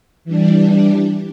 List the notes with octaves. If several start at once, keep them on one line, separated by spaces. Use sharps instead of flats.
E3 G3 D4